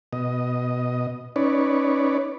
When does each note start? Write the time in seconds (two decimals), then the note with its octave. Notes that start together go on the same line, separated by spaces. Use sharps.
0.13 B2 D#5
1.36 C#4 D#4 B4 C#5 D5